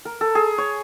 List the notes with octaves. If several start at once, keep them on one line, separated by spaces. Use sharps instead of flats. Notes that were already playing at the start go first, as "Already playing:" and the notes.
A#4
A4
G#4
C#5